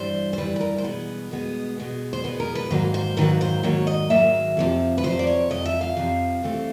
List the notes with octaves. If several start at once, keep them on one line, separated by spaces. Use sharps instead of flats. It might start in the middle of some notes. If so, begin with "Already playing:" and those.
Already playing: G2 E3 G3 C5
C5
G2 E3 G3 B4
B4
A#4
C5
B2 G#3 B3 B4
B2 G#3 B3
B2 G#3 B3
C5
B2 G#3 B3 B4
A#4
B4
G#2 D#3 F#3 A#3 C5
C5
G#2 D#3 F#3 A#3 B4
C5
G#2 D#3 F#3 A#3 C#5
D#5
G#2 D#3 F#3 A#3 E5
F2 C3 F3
B4
F2 C3 F3 C5
D5
C#5
F2 C3 F3 D#5
E5
F5
F2 C3 F3
G2 E3 A3 C4